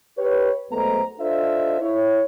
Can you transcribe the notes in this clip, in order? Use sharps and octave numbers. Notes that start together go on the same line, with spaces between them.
G4 B4 C#5
B1 G#3 A3 B3 C5 A#5
D4 F4 A4 C5 D#5 E5
E4 C#5